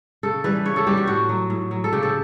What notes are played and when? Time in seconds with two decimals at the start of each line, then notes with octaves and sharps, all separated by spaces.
0.23 C#3 A4
0.44 E3 G3 B4
0.65 C#3 C#5
0.76 A4
0.87 E3 G3 G4
0.97 F#4
1.07 A2 F#4
1.29 F#3
1.50 A2
1.71 F#3
1.84 A4
1.93 C#3 G4
2.03 A4